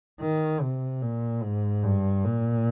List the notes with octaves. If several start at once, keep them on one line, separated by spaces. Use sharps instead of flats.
D#3
C3
A#2
G#2
G2
A#2